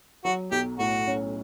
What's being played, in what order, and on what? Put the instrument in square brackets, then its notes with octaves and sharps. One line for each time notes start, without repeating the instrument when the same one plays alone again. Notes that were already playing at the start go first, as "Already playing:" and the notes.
[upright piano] F#3 [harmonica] F#4
[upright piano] B1 [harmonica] G4
[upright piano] A2 [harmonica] F#4
[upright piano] C#4